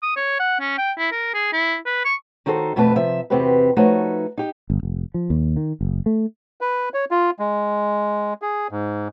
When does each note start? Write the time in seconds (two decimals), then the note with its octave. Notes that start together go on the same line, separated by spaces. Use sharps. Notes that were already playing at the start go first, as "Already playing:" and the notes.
0.03 D#6
0.16 C#5
0.39 F#5
0.60 C#4
0.78 G5
0.98 E4
1.12 A#4
1.34 G#4
1.53 E4
1.86 B4
2.05 C#6
2.46 D#3 D#4 F#4 A4 C5
2.76 F2 B2 A3 B3 B4 A5
2.96 C3 F3 E5
3.30 E2 C3 C4 F#4 G4 B4
3.76 F3 A3 D#4 F#4 B4 C#5
4.38 D#4 G4
4.70 G1
4.83 F1
5.14 F3
5.30 D#2
5.56 D#3
5.81 F#1
6.06 A3
6.61 B4
6.94 C#5
7.11 F4
7.39 G#3
8.42 G#4
8.71 G#2